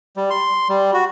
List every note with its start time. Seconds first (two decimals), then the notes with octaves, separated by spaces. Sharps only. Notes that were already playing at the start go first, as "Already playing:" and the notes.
0.17 G3
0.30 C6
0.69 G3
0.93 F#4